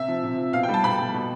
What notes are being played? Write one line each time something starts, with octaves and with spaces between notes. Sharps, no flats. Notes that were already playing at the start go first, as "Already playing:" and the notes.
Already playing: C3 E5
F3
C3
F3
B2 F5
G5
G3
A5
B2 B5
G3
B2